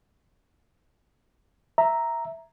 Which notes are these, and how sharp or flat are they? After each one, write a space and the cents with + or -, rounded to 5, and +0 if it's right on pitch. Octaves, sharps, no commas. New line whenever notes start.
E5 +0 A#5 +0